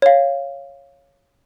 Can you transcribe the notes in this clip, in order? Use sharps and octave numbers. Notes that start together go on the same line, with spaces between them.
C#5 F5